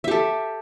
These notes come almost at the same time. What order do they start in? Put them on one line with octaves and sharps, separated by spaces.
E5 G4 A4